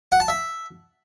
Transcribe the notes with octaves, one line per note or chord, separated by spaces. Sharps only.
F#5
A5
E5